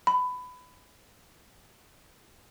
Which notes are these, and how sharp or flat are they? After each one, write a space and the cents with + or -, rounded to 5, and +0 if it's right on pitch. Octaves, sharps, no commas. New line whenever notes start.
B5 +20